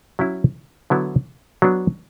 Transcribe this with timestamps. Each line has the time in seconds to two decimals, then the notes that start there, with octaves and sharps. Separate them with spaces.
0.19 F#3 C#4 E4
0.90 D3 F#3 B3 E4
1.62 F#3 B3 D4